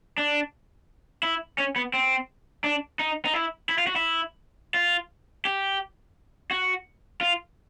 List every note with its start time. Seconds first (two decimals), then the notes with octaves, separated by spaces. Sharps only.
0.18 D4
1.23 E4
1.58 C#4
1.76 B3
1.94 C4
2.64 D4
2.99 D#4
3.25 D#4
3.34 E4
3.69 E4
3.78 F4
3.87 F#4
3.96 E4
4.74 F4
5.45 G4
6.51 F#4
7.21 F4